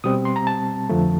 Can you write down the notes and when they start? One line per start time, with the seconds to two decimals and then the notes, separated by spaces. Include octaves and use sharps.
0.04 B2 G3 C4 D#6
0.25 C6
0.36 A#5
0.47 A5
0.90 F2 D3 F3 A3